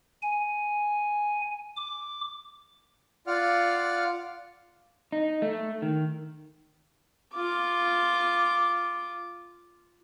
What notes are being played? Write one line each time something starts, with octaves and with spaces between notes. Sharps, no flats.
G#5
D6
F4 D5 F5 F#5 F6
D#4
A3
D#3
F4 D6